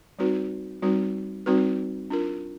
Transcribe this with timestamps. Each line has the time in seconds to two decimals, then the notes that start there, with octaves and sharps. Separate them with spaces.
0.19 G3 C4 D#4 F#4 B4
0.82 G3 C4 D#4 F#4 B4
1.46 G3 C4 D#4 F#4 B4
2.10 D4 F4 A#4